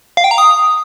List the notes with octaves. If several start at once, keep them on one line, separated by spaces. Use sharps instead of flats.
F5
G5
A#5
D#6